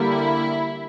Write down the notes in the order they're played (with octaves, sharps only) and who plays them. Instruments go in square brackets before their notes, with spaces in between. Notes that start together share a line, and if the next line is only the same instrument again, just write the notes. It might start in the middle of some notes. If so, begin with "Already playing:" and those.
Already playing: [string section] D3 G3 A#3 E4